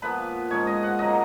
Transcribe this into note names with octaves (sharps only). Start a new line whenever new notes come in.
A#2 F3 B3 B4
G#2 F3 G#3 C#4 C#5
D#5
F#5
C#3 F#3 A#3 D#5